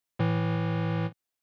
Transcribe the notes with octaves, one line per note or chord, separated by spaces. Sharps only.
A2 E3